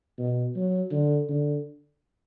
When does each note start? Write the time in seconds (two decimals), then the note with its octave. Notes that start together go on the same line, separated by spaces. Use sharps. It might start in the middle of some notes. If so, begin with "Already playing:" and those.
0.18 B2
0.56 F#3
0.92 D3
1.29 D3